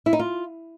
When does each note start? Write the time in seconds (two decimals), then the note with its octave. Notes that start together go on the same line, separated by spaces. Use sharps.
0.06 E4
0.13 D#4
0.19 F4